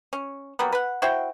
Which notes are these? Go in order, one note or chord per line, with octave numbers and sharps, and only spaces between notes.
C#4
F#3 G3 A#3 B3
B4 F#5
E4 F#4 C5 G5